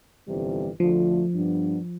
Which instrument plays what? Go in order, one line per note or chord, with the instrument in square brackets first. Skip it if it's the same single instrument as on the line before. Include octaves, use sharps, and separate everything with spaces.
[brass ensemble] G1 F2 C3 E3 G3
[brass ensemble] D2 D3 A3 D4 F4 [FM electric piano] F3
[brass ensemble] G2 F3 B3 D4